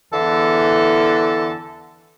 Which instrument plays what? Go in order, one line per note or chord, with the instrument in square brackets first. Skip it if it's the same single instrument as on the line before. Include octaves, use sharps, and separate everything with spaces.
[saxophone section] E2 D3 E3 A4